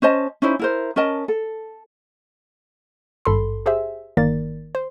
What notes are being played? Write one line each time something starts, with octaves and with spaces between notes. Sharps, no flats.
C#4 C5 D#5 A5
C#4 D#4 E4 C5
E4 A#4 C5
C#4 A#4 D#5 A5
A4
G#1 G2 A4 B5 C6
G4 G#4 C5 E5
G1 D#3 A#3 A#4 D5 A6
C5